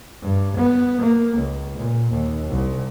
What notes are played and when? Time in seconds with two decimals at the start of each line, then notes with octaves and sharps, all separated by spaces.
0.22 G2
0.57 B3
1.01 A#3
1.37 C#2
1.78 A#2
2.12 D#2
2.49 C2